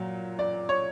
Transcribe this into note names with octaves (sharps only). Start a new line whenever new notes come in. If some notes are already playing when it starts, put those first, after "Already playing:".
Already playing: A#2 F#3
D5
C#5